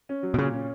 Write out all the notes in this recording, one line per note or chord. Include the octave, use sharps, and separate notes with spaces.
C#4
F#3
B2
A#2 C#3
C#4